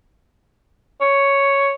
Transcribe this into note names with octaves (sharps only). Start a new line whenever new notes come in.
C#5